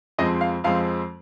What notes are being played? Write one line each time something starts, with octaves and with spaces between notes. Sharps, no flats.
F2 F3 G#3 C4 D#5
F5
F2 F3 G#3 C4 F5